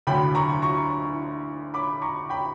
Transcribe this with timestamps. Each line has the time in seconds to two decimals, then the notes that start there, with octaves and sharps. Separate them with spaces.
0.07 D2 D3 F#3 G5 B5
0.35 A#5 C#6
0.62 A#5 C#6
1.74 B5 D6
2.02 A#5 C#6
2.30 G5 B5